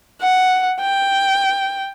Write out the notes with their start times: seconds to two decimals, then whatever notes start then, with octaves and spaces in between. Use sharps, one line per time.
0.21 F#5
0.80 G5